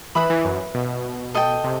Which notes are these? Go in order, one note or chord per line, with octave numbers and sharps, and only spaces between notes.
E3 B4 E5 B5 D#6
E3
F#2
B2
A4 D#5 G5
C3